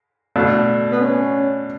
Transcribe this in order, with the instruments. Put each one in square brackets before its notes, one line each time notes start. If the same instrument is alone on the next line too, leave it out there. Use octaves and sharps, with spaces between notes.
[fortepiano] B2 A3 D4
[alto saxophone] B3
C#4